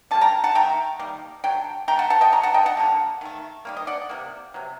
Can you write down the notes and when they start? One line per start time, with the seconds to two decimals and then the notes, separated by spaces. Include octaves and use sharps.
0.11 D3 G3 A#3 A5
0.21 G5 A#5
0.44 F#5 A5
0.55 D#3 A3 G5 A#5
0.99 D#3 G3 A#3
1.44 D3 F#3 G5
1.88 D3 A3 G5 A#5
1.99 F#5 A5
2.10 F#5 A5
2.21 D#5 G5
2.32 D3 F#3 A#5
2.43 F#5 A5
2.54 D#5 G5
2.66 F#5 A5
2.77 D3 G3 A#3
3.21 D#3 A3
3.65 D#3 G3 A#3
3.77 D#5
3.87 D5 F#5
4.09 C3 G3 A#3
4.54 C3 F#3